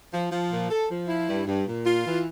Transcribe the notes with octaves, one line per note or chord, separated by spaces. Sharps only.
F3
F3
A#2
A4
F3
E4
G2
G2
A#2
F4
E3